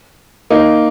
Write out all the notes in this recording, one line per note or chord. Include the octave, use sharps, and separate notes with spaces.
A#3 D#4